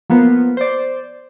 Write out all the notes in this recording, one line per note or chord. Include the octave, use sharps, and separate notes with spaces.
F3 A#3 B3 F4
C5 D5